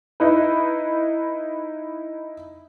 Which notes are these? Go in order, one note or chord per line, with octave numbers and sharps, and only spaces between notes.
D#4 E4 B4